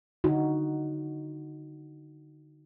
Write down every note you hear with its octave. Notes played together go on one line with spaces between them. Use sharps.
D3 D#4 F#4